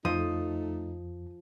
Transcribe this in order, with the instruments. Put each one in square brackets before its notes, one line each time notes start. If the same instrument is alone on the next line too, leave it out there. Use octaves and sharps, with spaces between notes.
[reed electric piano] F2 [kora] F3 [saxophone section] A3 D#4 [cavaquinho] D#6